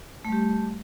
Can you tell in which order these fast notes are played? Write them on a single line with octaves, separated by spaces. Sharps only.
A3 G3 G4